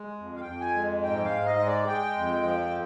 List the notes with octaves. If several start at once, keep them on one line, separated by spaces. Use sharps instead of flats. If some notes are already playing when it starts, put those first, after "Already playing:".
Already playing: G#3
F2
F5
G5
F2
G#5
G#3
G#2 G5
F5
G#2
D#5
G#3
D5
G#3 G5
F2
F3